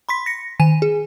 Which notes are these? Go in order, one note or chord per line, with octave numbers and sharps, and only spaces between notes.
B5 C6 B6
A#6 C#7
D#3 G#5 D#7
G#4